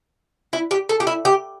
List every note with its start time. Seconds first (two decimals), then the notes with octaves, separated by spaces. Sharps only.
0.53 E4
0.71 G4
0.89 A4
1.00 G4
1.07 E4
1.25 G4